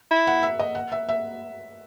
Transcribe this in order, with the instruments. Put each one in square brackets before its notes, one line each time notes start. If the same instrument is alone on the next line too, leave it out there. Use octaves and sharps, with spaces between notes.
[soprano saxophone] E4
[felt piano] F#5
E5
D#5
F#5
E5
E5